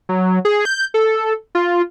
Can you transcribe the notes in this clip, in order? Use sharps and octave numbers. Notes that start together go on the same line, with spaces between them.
F#3
G#4
G6
A4
F4